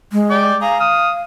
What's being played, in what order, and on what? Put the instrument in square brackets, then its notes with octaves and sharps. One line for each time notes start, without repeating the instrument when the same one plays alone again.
[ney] G#3
[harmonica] D5 G5 D6
[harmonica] G#4 A#5 [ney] F5
[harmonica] D#6 F6